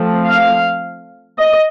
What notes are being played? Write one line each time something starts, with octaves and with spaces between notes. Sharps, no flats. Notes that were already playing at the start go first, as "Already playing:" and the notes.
Already playing: F3 A3 C4
F5
D#5